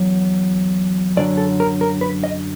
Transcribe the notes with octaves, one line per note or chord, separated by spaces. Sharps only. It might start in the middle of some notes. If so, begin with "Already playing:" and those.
Already playing: E2 F#3
F#2 D3 F#3 D5
A4
A#4
A#4
B4
D#5